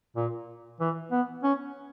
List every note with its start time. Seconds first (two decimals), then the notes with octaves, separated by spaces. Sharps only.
0.16 A#2
0.80 E3
1.11 B3
1.43 C#4